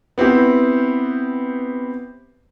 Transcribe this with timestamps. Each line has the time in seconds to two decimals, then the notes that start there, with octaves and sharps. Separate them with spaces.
0.18 B3 C4 E4 G4 B4